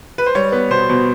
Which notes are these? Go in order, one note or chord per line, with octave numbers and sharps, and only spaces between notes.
B4
C5
G3 C#5
B3
B2 C5
B2